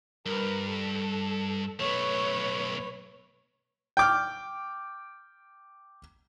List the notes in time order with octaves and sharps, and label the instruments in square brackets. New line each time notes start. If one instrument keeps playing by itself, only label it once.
[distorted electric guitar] G2 [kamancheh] A#4 B4
[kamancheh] A4
[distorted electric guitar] B1 A3 [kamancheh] B4 C#5
[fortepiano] G5 D6 F6